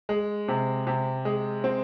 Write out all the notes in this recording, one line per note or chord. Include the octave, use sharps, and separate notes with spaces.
G#3
C3
C3
G#3
C4